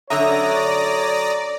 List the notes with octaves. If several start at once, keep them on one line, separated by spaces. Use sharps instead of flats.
F#2 D3 C#5 D5 E5 A#5 D#6